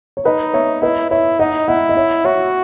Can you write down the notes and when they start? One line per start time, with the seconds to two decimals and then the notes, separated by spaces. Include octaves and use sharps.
0.17 C#5
0.25 D#4 B4 D#5
0.54 C#5 E5
0.82 E4 B4 D#5
1.10 E4 C#5 E5
1.39 D#4 D#5 F#5
1.68 E4 D#5 F#5
1.89 D#5
1.96 C#5 E5
2.25 F#4 C#5 E5